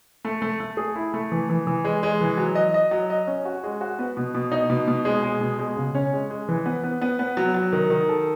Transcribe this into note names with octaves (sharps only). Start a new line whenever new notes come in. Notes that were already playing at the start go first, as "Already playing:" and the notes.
A3
A3
A3
G#4
E4
A3
E3
E3
E3
G#3
G#3
E3
F#3
D#5
D#5
F#3
D#5
C#4
F#4
G#3
F#4
B3
B2
B2
D#4
B2
B2
G#3
G#3
B2
G#3
C#3
C#4
G#3
G#3
E3
B3
B3
B3
B3
F#3
F#3
D#3
D#3
A4